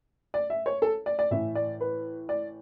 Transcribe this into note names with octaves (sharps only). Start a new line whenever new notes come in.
D5
E5
C#5
A4
D5
D5
A2 E3 E5
D5
B4
D5